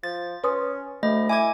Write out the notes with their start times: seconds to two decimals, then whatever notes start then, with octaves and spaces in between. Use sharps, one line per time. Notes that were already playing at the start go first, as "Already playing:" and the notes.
0.03 F3 A6
0.44 C#4 B4 C6 D#6
1.03 D2 A3 D#5
1.29 E4 G#5 D6 G#6